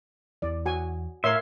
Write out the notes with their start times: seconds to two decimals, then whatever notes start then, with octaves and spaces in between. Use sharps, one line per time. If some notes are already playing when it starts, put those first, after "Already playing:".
0.42 E2 E3 D5
0.66 F#4 G#5
1.24 A2 A#4 C#5 E5 F5 C6